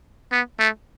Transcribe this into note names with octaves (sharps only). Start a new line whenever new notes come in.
B3
A3